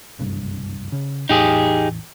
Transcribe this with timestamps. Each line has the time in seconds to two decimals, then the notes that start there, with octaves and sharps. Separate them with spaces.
0.19 F#1 C2 G2
0.92 C#3
1.29 A1 E2 D#4 G4 G#4